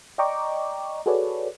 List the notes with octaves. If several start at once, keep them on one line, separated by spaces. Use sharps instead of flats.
D5 D#5 G5 A#5 C#6 D6
F#4 G#4 A4 B4 C#5 D5